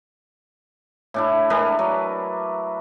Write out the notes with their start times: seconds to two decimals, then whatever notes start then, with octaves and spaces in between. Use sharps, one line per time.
1.14 A2 D4 E4
1.50 G#3 D4 A#4 B4
1.79 F#3